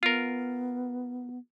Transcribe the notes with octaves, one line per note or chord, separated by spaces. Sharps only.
B3 F4 A#4